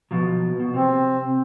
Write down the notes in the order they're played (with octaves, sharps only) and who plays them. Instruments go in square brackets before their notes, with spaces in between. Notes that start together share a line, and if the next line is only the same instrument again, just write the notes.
[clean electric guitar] B2 F3 F#3
B2
[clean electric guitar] C3 [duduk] C4